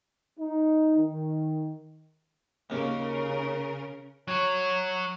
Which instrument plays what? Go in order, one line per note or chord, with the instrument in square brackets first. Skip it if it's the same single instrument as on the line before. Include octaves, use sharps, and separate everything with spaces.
[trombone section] D#4
D#3
[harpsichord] D#2 A#3 [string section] C#3 A#4
[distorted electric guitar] F#3 F#4 [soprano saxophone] C#5